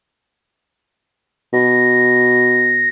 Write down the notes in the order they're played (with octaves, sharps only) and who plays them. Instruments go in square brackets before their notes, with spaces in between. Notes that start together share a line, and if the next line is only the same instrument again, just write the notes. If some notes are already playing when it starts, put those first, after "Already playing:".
[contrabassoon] B2 [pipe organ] A#6